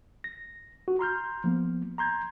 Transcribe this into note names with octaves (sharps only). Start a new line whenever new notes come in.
A#6
F#4
A#5 C6 F6 G6
F3 A#3 B3
A#5 C6 G6 G#6